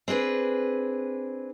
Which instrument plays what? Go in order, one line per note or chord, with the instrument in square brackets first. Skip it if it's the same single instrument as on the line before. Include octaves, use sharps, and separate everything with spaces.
[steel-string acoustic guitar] C4 D4 G#4 B4